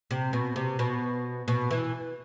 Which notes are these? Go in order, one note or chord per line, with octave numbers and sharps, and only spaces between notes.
C3
B2
C3
B2
B2
E3